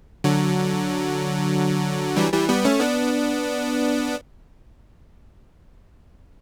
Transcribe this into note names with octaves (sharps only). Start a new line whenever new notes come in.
D3 F#3
E3 G3
E3 G3
G3 B3
A3 C#4
B3 D4